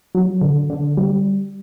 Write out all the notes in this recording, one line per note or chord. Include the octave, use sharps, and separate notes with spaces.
F#3
D3
D3
G3